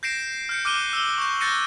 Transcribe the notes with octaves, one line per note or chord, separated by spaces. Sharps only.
G6 A#6 C7 D7 E7
F6 G6 C#7
D6 F6 F#6 D#7 G7
E6 G7
C#6 G6
F#6 G6 A6 A#6 C#7 D#7